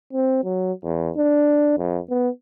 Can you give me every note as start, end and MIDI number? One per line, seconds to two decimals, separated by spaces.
0.13 0.42 60
0.44 0.72 54
0.84 1.10 40
1.17 1.75 62
1.78 1.99 41
2.10 2.29 59